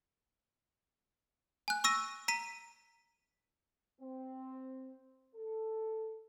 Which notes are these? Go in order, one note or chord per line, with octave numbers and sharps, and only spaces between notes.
G#5 F#6
C#6 E6 A#6 D#7
A#5 B6 D#7
C4
A4